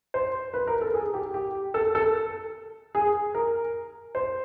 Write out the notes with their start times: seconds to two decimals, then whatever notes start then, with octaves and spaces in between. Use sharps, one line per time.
0.14 C5
0.54 B4
0.67 A#4
0.81 A4
0.94 G#4
1.14 G4
1.34 G4
1.74 A4
1.95 A4
2.95 G#4
3.35 A#4
4.15 C5